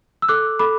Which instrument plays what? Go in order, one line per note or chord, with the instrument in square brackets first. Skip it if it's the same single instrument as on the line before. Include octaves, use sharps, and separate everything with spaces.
[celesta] E6
A4 D6 F#6
A4 B5 D6